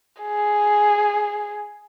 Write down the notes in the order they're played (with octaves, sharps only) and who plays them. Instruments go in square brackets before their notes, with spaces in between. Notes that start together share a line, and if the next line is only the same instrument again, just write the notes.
[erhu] G#4